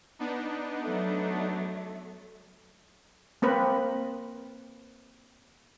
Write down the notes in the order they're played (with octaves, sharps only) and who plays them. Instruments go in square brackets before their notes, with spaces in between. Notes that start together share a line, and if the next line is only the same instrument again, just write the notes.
[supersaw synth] B3 D4 D#4
[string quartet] F#3 A3
[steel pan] A#3 C4 A#4 B4